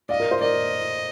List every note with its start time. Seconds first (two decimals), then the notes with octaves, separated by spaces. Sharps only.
0.09 D5 D#5 F5
0.20 A#4
0.31 C5
0.41 A#4 D5 D#5